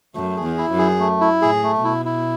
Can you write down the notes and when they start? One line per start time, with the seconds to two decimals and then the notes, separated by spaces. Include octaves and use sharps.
0.15 F#2 A3
0.36 G#4
0.43 E2
0.58 E4
0.71 F#2
0.78 G#4
1.00 A3
1.21 E4
1.42 A2 G#4
1.64 A3
1.84 B2 E4
2.06 E4